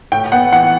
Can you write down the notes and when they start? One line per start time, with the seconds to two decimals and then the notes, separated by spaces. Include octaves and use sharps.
0.12 A2 G5
0.32 B3 F#5
0.53 E3 F#5